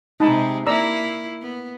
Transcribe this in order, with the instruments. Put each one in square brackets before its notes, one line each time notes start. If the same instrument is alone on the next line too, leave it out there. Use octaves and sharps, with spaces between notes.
[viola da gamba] C3 G#3 [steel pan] D#4 A5 B5
[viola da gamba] A#3 E4 [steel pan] D5 A#5 E6
[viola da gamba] B3